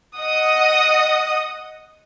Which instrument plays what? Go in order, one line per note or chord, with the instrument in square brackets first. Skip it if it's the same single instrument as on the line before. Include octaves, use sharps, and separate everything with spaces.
[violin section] D#5 F#5 D#6